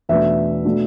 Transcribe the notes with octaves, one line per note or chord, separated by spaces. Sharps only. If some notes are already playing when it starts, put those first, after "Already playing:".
E2 B2 A3 D4 E5
B2 A3 D4